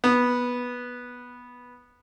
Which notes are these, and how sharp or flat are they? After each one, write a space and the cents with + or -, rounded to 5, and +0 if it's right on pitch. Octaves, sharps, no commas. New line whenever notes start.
B3 -10